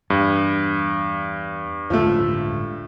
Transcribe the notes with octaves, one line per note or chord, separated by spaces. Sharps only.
E2 G2
D1 G1 C#2 F3 A3